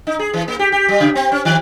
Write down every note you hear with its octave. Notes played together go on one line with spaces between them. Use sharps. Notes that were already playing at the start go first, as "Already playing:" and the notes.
D#4
G#4
E3
A#3
G4
G4
G3
C#3
C4
C#4
D#3